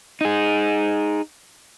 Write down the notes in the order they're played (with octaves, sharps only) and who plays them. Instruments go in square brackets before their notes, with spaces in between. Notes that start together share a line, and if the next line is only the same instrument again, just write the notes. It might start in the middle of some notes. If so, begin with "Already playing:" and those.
[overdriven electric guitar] D#4 G#4